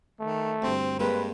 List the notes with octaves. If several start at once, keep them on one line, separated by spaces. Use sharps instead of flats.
D#3 A3
D2 G2 C4
G2 G#3 A#3 C4 B4